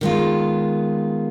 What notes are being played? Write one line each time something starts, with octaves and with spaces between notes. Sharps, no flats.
D#3 G#3 B3 F4